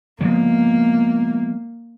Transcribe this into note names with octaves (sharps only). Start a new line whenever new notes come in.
F3 G#3 A#3 B3